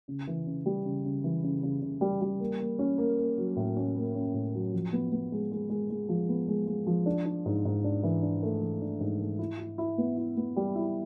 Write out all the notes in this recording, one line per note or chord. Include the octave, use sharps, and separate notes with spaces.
C#3
E3
C#3
G3
C#3
C#3
E3
C#3
C#3
C#3
G3
G3
A#3
A#3
C#4
A#3
A#3
F#3
A2
C#4
A#3
C#4
A2
F#3
F3
B3
B3
G#3
G#3
G#3
G#3
F3
B3
G#3
G#3
F3
D4
D4
G#2
G#2
D4
E3
D4
A3
E3
D4
G#2
A3
E4
E4
E4
B3
E4
B3
G3
E4